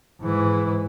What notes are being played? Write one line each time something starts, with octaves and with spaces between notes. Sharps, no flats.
G#2 E3